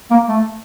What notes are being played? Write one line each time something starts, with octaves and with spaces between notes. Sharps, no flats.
A#3
A3